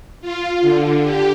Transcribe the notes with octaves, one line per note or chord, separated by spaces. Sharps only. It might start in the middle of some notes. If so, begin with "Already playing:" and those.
F4
D3
G4